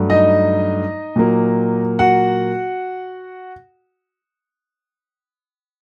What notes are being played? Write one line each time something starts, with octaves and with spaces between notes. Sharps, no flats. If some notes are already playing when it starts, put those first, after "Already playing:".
Already playing: G2 F#3 A3
D#4 D#5
A#2 F#3 A#3
F#4 F#5